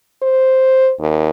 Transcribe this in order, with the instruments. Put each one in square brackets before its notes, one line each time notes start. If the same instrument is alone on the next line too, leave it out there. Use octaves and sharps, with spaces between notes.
[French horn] C5
D#2